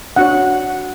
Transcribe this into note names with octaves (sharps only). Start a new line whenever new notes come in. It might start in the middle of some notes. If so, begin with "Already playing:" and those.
D4 F#4 C#5 F#5